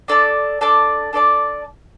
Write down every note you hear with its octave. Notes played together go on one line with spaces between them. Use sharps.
D4 A4 D5 A5
D4 A4 D5 A5
D4 A4 D5 A5